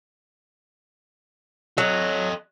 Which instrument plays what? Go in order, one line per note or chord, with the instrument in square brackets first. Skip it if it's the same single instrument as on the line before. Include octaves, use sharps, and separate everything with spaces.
[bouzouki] F#3 [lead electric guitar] A4 D#5